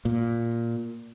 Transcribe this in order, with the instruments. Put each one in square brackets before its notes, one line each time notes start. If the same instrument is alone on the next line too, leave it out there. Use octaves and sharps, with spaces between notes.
[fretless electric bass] A#2